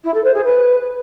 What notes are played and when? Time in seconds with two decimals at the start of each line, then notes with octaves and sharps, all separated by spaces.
0.04 E4
0.14 A4
0.24 C5
0.34 G#4
0.44 B4